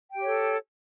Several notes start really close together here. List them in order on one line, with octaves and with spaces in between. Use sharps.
G5 G4 C#5 A4